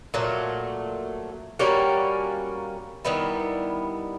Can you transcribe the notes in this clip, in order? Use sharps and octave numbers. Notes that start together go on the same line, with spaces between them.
A#2 F#3 A3
G3 A#3 C#4 F#4
D#3 G3 B3 E4